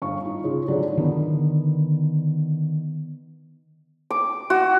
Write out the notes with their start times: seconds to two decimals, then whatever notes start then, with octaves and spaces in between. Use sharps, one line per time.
0.02 G1 F5 C#6
0.25 D#4 F4
0.44 C#3 F4
0.68 A2 D3 F#3 D4 D#4 F4
0.97 D3 D#3 B3
4.11 D6
4.50 F#4